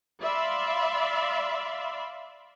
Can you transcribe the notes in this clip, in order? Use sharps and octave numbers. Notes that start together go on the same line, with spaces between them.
D5 E5 F5 B5 C6